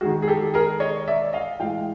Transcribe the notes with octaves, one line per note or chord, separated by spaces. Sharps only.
D#3 G#3 F#4 G#4
G#4
G4 A4
G#4 A#4
C#5 D#5
D5 E5
D#5 F5
A2 E3 G#3 F5 G5